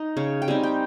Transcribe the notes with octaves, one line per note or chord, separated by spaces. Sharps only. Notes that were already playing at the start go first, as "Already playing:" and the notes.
Already playing: D#4
C#3 C#5
G5
G3 C4 D#4 G#5
G5